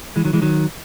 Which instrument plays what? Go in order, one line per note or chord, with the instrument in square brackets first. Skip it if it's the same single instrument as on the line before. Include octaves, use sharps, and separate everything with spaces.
[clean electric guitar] E3 G#3
D#3 F#3
E3 G#3
D#3 F#3